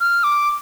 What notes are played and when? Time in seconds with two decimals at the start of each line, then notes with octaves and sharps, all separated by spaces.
0.01 F6
0.24 D6